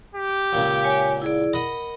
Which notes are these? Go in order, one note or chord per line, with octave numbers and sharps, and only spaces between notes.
G4
C#2 A#2
C#5 G#5
E4 G#4 D5
A#4 D#5 F#5 B5